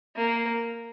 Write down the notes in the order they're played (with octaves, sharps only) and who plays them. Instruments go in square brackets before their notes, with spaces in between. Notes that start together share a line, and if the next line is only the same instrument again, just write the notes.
[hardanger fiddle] A#3